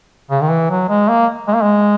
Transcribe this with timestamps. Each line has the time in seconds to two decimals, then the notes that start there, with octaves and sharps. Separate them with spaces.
0.31 C#3
0.42 D#3
0.50 E3
0.70 F#3
0.89 G#3
1.09 A#3
1.48 G#3
1.56 A#3
1.63 G#3